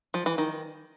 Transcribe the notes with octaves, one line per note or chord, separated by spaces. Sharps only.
F3
E3
D#3